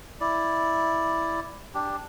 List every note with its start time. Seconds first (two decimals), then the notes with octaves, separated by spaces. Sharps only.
0.21 E4 D5
1.75 D4 G4